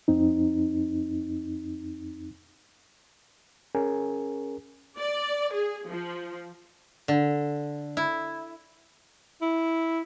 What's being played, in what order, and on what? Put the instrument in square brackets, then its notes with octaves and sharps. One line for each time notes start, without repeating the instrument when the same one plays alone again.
[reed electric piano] F2 C4 D#4
C#4 G#4 A#4 G#5
[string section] D5
G#4
F3
[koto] D3
E4
[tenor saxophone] E4